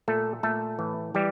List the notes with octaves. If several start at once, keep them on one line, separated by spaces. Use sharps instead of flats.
A#2 A3 A4
A#2 A3 A4
A2 E3
E3 G3 G4